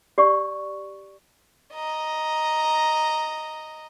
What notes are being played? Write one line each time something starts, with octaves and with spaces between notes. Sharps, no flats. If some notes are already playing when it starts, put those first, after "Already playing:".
G4 D5 C#6
D#5 A#5